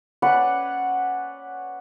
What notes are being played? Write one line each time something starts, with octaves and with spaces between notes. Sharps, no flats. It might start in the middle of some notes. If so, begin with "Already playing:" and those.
C#4 B4 D5 F#5